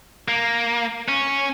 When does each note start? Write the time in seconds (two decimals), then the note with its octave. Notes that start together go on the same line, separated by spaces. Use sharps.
0.28 A#3
1.08 C#4